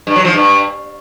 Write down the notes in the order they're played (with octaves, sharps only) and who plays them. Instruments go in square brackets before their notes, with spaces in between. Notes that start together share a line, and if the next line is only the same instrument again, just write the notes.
[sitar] G2
F#3
F3
G2